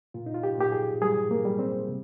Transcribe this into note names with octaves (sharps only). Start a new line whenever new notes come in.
A#2 F4
D#4
F4
G4
A#2 G4
G#4
G3 G#4
A#3
G3
C4
C3